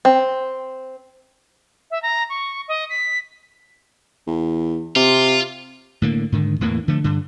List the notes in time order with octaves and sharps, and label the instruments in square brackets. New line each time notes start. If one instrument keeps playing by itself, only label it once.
[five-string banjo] C4
[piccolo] E5
A#5
C#6
D#5
B6
[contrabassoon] E2
[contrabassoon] C3 [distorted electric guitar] F4
[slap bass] A2 D3 A#3
G#2 D3 D#3
E2 A2 E3 A#3
D3 F3 A3
G2 D3